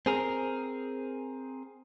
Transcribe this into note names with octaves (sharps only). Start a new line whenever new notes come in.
C4 G#4 A#4